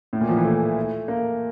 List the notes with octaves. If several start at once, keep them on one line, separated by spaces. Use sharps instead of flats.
A2
A#2
F3
E3
A3
A#3